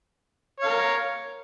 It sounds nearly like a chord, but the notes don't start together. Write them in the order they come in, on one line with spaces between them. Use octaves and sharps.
C#5 F5 A#4